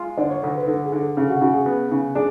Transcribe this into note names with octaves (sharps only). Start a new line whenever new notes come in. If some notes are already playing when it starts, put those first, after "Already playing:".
Already playing: G#3 F4
D3 D5
C#5
D2 A4
B4
D3 A4
G#4
D3
A4
C#3 G#4
F#4
C#3 F#4
G#4
B3
C#3
D4 G#4